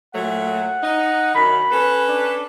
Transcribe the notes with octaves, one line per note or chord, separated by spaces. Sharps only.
A#2 F#3 A3 F#5
D#4
F#2 D#3 B5
C#4 A4 B4
D4